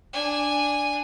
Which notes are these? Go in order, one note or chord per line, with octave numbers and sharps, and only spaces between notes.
D4 G#5